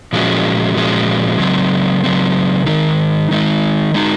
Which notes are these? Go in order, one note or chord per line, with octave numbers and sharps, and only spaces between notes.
A#2 F3 G#3 C#4 F#4
A#2 F3 G#3 C#4 F#4
C#3 F#3 C4
C#3 F#3 C4
D#3 G#3 D#4
D#3 G#3 D#4
G#3 D#4 F#4